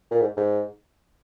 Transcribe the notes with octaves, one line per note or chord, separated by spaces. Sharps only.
A#2
G#2
G#2